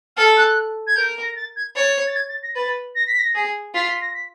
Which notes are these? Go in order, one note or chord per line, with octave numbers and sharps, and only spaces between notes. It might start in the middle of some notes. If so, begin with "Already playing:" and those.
A4 F6
F#6
G#6
A#4 G6
A#6
A6
G#6
C#5 A6
A6
G#6
A6
A#6
B4 A6
A#6
B6
A#6
G#4
F4 B6
B6
A#6
B6